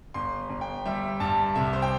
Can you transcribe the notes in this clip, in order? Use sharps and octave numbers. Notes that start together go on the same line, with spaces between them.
G1 C6
G1
G5
G3 E5
G2 A5
C2 E5
C5
G5